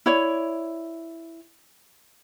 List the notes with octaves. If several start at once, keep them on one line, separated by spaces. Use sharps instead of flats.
E4 C#5 D5